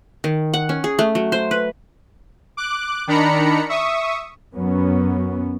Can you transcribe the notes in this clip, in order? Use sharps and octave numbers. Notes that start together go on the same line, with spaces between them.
D#3
F#5
C#4
G#4
A3
F#3
C5
B4
D6 F#6
D#3 D4 A#5 B5 C#7
E5 C#6 D#6
F#2 F#3 B3 C#4